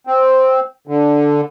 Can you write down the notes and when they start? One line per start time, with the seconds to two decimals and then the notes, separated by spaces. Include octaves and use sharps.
0.07 C4
0.87 D3